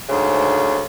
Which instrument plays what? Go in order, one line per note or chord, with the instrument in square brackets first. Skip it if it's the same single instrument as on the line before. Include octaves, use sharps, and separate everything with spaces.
[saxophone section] D2 G#2 C#3